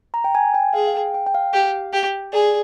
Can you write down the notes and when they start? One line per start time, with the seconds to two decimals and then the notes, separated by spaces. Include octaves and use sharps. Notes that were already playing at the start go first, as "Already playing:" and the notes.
0.14 A#5
0.24 G5
0.35 G#5
0.54 G5
0.73 G#4 F5
0.87 F5
0.94 G5
1.14 G5
1.27 G5
1.34 F5
1.54 G4
1.93 G4
2.33 G#4 D5